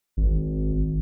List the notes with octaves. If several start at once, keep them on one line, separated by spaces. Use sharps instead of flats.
G#1